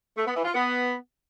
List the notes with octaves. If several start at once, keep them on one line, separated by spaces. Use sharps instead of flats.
A3
B3
E3
F4
B3